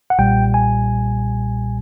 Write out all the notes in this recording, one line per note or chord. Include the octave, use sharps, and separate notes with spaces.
F#5
B1 A#2 G3 G5
G#5